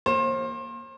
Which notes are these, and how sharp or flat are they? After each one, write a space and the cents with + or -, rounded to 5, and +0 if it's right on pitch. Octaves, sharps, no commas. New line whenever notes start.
A#3 +0 C5 +35